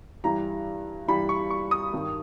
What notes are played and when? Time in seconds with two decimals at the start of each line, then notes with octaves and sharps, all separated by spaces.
0.24 G2 E3 G3 A#5
1.08 G2 E3 G3 B5
1.29 C#6
1.50 C#6
1.71 D#6
1.93 G2 D#3 G3